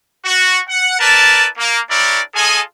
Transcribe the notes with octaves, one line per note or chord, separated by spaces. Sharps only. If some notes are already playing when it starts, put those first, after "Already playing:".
F#4
F#5
E4 A#4 B4 D5 A5
A#3
D4 E4 G4 A#4 C#5 D5
F4 G#4 A4 D#5 G#5